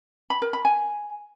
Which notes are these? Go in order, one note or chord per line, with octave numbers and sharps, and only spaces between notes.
B5
A#4
B5
G#5